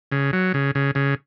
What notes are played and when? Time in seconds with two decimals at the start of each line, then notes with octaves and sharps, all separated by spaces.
0.12 C#3
0.33 F#3
0.54 C#3
0.75 C#3
0.95 C#3